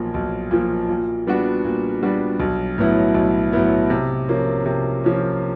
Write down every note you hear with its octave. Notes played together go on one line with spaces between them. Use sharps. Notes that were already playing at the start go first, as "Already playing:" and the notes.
Already playing: B1 A#2 F3
B1
A#2 F3
A#2
G3 B3 D4 F#4
A#2
G3 B3 D4 F#4
B1
A2 F#3 B3 E4
B1
A2 F#3 B3 E4
C3
F3 A#3 C#4
C3
F3 A#3 C#4